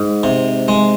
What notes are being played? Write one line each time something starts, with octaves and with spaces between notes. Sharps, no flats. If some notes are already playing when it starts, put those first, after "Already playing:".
Already playing: G#2
C3
G#3